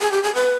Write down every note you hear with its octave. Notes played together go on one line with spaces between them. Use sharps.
G#4
G4
G#4
B4